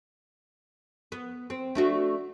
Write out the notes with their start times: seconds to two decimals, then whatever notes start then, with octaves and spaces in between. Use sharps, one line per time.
1.12 B3
1.50 C4
1.75 A3 D4 F#4